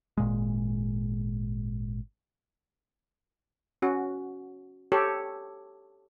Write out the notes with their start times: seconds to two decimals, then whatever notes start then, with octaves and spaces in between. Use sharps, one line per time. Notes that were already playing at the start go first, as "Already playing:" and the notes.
0.17 G#1 A#2 G#3
3.82 C#4 F#4
4.92 G4 A4 C#5